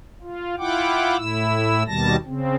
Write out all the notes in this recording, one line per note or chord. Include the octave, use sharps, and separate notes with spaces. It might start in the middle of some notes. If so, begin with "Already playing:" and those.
F4
E4 F4 F#5 G5 D6
A2 E4 E6
D#2 B2 D#3 G3 A5 A#6
C#3 C4